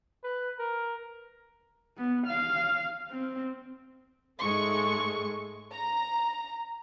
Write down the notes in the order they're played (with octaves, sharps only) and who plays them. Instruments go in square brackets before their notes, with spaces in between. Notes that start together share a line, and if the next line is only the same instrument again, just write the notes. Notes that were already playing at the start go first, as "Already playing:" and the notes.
[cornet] B4
A#4
[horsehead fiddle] B3
F5
C4
[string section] G#2 G#3 A3 C#6
A#5